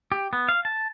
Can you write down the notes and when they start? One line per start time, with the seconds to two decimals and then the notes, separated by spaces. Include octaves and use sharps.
0.12 G4
0.33 B3
0.49 F5
0.65 A5